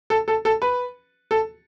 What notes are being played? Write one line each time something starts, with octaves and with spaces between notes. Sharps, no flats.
A4
A4
A4
B4
A4